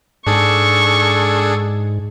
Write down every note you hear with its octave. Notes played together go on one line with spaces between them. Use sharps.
G#2 D4 G#4 A4 C#6